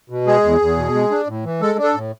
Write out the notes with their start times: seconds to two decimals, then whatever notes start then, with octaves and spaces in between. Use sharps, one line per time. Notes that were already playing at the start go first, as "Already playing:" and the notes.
0.10 B2
0.27 G#3 G#4
0.44 E2
0.61 E2
0.77 B2
0.94 G#3
1.11 D4
1.27 A2
1.44 E3
1.61 G#3 A4
1.78 D4 A4
1.95 A2